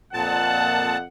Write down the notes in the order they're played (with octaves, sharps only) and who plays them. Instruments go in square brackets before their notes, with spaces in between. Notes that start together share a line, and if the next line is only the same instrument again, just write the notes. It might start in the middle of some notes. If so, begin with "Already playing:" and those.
[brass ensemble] F2 F#5 [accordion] A#2 A5